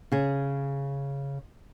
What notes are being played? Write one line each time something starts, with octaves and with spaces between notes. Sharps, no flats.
C#3 G#4